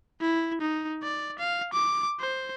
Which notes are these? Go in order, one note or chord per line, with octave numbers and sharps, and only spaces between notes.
E4
D#4
D5
F5
D6
C5